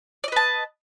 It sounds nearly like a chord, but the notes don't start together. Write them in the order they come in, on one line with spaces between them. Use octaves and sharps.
D5 D#5 B4 A5